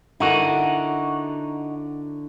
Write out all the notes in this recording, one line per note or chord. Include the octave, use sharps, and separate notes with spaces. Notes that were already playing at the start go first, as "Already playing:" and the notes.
D3 D#4 E4 F#4 A#4